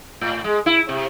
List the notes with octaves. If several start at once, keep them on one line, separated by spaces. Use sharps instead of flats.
A2
G#3
E4
C3